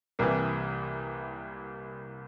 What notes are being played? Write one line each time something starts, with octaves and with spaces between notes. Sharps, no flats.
C2 C3 E3 G3 A#3